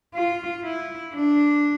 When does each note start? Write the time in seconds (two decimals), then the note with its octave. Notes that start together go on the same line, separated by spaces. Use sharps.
0.14 F4
0.64 E4
1.15 D4